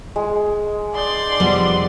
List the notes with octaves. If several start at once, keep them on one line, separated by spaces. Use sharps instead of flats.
G#3
D5 A5 C6 D#6 G6
F1 F2 G3 B3